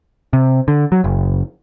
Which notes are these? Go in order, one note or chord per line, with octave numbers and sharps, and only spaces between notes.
C3
D3
F#3
F#1